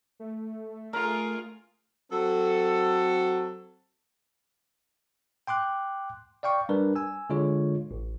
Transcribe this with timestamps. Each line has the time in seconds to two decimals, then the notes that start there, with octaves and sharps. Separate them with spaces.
0.20 A3
0.93 F4 G#4 A#4
2.10 F#3 C4 A4
5.47 G5 C6 D6 F#6
6.43 D5 F5 G5 C#6
6.69 G3 D4 A#4 B4
6.96 G#5 E6
7.30 D3 G#3 F4 C#5
7.91 A1